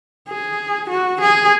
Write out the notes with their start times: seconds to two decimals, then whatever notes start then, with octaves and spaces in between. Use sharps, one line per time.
0.28 G#4
0.90 F#4
1.21 G#4